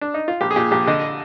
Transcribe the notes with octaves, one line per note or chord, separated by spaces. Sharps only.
D4
D#4
F4
A#1 G4
G#4
A#2 G4
A#1 G4
D3 D#5